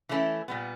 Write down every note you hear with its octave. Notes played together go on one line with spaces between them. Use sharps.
E3 A3 C#4 E4
A#2 G3 B3